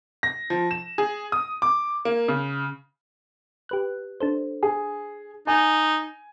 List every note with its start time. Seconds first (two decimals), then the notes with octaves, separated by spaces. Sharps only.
0.23 A#6
0.50 F3
0.71 E7
0.98 G#4
1.32 D#6
1.62 D6
2.05 A#3
2.28 C#3
3.69 G4 B4 F#6
4.21 D4 A4 C5
4.63 G#4
5.47 D#4 G#5